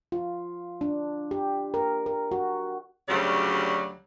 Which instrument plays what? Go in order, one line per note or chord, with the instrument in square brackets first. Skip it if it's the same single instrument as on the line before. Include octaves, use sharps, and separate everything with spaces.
[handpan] F4
D4
G4
A#4
A#4
F#4
[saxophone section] D2 C#3 F#3 G3 D5